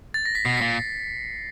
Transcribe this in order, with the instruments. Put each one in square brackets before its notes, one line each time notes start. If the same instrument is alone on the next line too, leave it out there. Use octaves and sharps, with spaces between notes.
[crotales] A6
A#6
B6
[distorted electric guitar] B2 [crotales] C7
[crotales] B6 C#7
[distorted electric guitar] A#2